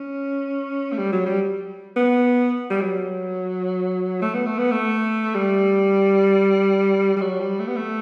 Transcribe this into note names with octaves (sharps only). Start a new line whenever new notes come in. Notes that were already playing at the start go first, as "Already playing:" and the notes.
Already playing: C#4
A3
G3
F#3
G3
B3
G3
F#3
A3
B3
A3
B3
A3
G3
G3
F#3
G3
A3
B3
A3